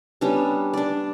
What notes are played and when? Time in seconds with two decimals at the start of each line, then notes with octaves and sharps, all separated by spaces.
0.21 G3 B3 C#4 D4
0.73 D4 D5